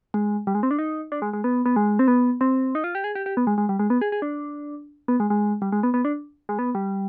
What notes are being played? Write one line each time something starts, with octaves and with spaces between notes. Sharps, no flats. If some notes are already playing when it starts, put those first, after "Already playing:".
G#3
G3
G#3
C4
D4
D#4
D4
G#3
G#3
B3
B3
G#3
C4
B3
C4
D#4
F4
G4
G#4
G4
G4
B3
G#3
G#3
G3
G#3
B3
G#4
G#4
D4
B3
G#3
G#3
G3
G#3
B3
B3
D4
G#3
B3
G3